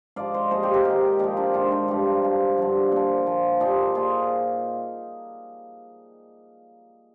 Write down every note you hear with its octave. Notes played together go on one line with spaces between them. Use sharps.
G#2 F3 D5 F5
C5 D#5
A#2 F3 G#4 C5
G4 A#4
G4 A#4
G#2 D#3 D#4 G4
A#2 F3 D#4 G4
D4 F4
G#2 D#3 D4 F4
D4 F4
G2 F3 D#4 G4
G2 F3
G2 D3 F3
A#2 F3
A#2 F3
A#2 F3 D#4 G4
A#2 F3 F4 G#4